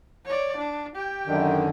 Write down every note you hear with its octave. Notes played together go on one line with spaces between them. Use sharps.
C#5 D5
D4
G4 G5
F#2 D3 D#3